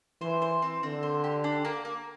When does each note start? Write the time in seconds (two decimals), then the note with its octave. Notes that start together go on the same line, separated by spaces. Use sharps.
0.21 E3 C5
0.42 C5
0.62 C4
0.83 D3 C4
1.03 C5
1.24 G4
1.44 D4
1.65 A#3
1.85 A#3